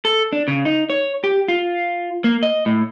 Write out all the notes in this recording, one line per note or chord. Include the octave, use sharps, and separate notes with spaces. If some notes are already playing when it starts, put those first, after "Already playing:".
A4
D4
C#3
D#4
C#5
G4
F4
A#3
D#5
A2